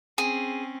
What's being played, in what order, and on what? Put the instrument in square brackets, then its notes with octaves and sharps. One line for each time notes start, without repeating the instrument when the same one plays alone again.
[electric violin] C4 C#4 [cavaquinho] G#4